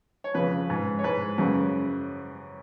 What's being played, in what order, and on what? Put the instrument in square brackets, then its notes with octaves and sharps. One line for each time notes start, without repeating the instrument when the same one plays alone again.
[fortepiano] C#5
F2 C#3 B4
G#2
C#5
G#2 B4
F#2 C#3